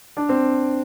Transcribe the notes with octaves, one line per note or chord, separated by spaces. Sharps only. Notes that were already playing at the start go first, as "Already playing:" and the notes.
D4
C4